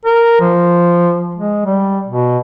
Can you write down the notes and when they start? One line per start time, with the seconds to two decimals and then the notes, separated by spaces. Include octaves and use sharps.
0.05 A#4
0.40 F3
1.35 G#3
1.65 G3
2.07 B2